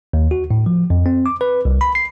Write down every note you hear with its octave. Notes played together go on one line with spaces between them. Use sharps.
D#2
F#4
A2
F3
F2
C4
D6
B4
C2
B5
C7